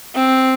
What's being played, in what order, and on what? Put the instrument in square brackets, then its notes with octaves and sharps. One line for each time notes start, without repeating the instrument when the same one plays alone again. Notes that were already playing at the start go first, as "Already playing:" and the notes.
[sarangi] C4